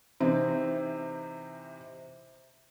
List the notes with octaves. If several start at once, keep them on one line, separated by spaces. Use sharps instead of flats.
C3 E3 C4 D#4